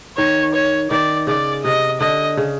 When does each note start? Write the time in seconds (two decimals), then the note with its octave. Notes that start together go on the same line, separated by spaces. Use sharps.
0.17 D#3 C#5
0.54 C#5
0.91 D#3 D5
1.27 C#3 D5
1.64 C3 D#5
2.00 D3 D#5
2.37 C#3